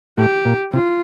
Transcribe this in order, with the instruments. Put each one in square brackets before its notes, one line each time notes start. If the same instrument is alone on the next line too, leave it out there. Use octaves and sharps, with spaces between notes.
[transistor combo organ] A2 [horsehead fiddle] G4
[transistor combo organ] A#2
[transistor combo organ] C3 [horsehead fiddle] F4